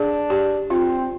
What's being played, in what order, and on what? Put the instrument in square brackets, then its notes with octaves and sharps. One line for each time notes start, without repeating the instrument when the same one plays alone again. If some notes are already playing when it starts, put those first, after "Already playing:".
Already playing: [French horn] D4 [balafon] G#4
[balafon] G4
[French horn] C4 [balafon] F4